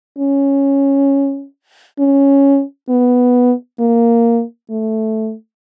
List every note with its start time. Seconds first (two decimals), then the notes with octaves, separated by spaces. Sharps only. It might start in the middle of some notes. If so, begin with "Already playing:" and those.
0.18 C#4
1.99 C#4
2.89 B3
3.80 A#3
4.70 A3